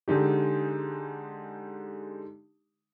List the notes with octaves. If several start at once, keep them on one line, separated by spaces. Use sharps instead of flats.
D3 G#3 D#4 G4